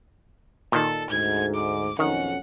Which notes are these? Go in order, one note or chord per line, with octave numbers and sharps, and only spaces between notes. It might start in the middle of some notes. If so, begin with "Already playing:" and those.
A#2 D#3 A4
D2 G#2 G#6
D6
B1 F2 D#3 C#4 F#5